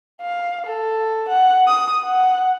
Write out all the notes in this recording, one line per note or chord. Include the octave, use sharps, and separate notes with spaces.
F5
A4
F#5
D#6
F#5